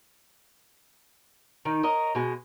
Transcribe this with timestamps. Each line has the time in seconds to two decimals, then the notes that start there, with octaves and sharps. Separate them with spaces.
1.65 D#3 D#4
1.83 A#4 C#5 D#5
2.15 B2 G#3